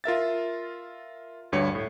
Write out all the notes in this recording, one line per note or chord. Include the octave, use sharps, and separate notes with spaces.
F4 A#4 E5 A6
D2 G2 C#5 C#7
A2